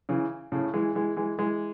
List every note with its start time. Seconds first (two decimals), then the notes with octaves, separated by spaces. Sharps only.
0.09 C#3 E3
0.52 A2 C#3
0.74 E3 G#3
0.95 E3 G#3
1.16 E3 G#3
1.39 E3 G#3